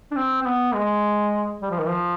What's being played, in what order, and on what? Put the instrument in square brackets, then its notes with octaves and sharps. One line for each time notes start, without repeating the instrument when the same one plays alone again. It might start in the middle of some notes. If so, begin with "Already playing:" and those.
[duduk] D4
C4
C4
B3
G#3
G3
F3
D#3
F3